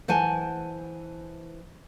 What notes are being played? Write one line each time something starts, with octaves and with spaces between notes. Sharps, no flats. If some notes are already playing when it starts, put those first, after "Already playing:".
E3 C5 F#5 G#5 A5